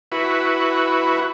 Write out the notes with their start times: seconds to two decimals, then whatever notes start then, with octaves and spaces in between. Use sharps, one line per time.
0.12 E4 F#4 B4